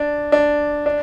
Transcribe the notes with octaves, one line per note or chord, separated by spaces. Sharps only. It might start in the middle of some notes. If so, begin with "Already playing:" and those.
Already playing: D4
D4
D4